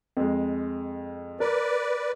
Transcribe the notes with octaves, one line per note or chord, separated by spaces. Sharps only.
F2 G#3
A#4 B4 D5